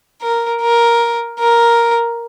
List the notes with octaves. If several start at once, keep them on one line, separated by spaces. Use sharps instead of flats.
A#4
A#4
A#4